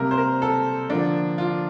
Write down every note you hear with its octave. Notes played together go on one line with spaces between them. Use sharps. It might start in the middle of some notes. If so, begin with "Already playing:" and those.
Already playing: C3 G3 A#3 A#4
C5
A#4
A4
D3 F3 A#3 D4
F4